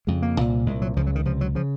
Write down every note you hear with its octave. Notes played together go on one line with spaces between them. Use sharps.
F2 C#3 G#3
A#3
C2 A#2
C2 A#2 G#3
F#3
C#2 C#3 F3
F#3
D#3
C#2 C3 F3
F#3
C#3 F3